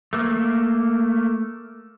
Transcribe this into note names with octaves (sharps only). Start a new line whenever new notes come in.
A3 A#3